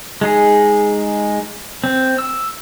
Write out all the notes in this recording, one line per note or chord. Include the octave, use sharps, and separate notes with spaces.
G#3 D#4 G#4
C4
E6